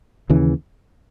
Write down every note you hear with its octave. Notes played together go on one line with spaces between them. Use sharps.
D#2 C#3 E3